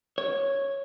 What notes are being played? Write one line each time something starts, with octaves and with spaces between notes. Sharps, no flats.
C#5